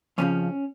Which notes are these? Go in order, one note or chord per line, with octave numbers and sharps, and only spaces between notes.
F2 C#3 F3 C#4